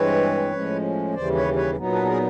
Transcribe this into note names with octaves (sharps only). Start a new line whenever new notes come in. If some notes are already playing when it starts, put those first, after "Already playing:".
Already playing: G2 E3 G#3 C4 B4 C#5
A2 F3 G#3 C#4
D#2 C#3 E3 G3 C5 D5
B4 C#5
B4 C#5
A#2 F#3 B3 D#4
A4 B4
A4
G#4 A#4